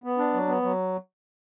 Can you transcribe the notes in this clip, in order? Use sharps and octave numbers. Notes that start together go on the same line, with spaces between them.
B3
D4
F#3
B3
F#3